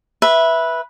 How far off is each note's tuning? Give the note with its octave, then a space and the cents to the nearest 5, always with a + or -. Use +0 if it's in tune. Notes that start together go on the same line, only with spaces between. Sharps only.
B4 -10 E5 +0